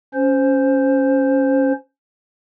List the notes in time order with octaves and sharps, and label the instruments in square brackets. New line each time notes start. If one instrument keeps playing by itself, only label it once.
[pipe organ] C#4 C5